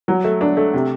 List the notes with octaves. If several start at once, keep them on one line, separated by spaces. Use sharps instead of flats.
F#3
A3
D4
A3
C3